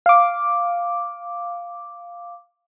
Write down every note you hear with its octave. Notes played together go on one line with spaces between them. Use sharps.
F5 D6